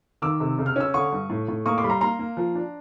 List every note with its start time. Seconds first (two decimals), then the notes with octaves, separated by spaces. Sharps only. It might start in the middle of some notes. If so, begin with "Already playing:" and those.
0.22 D#3 D6 E6
0.40 C3
0.58 C#3
0.66 F6
0.76 C#4 E6
0.94 D3 C#6 D#6
1.12 G2
1.30 A2
1.48 A2
1.66 A#3 C#6 D#6
1.78 C6 D6
1.84 G3 B5
1.90 A#5 C6
2.01 A#3 A#5 C6
2.19 A#3
2.37 F3
2.55 D4